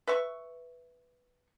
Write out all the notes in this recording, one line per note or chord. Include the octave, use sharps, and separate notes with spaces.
B4 E5 C#6